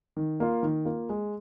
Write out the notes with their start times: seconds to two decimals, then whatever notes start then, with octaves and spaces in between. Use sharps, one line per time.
0.16 D#3
0.40 A#3 F4
0.63 D#3
0.85 A#3 F4
1.09 G#3